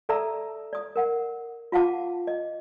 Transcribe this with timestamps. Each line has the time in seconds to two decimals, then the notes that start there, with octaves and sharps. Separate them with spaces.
0.09 A4 D5 E5 A5 A#5 E6
0.73 D5 D#6
0.96 A#4 F#5
1.72 F4 F5 F#5 A5 D6
2.27 D#5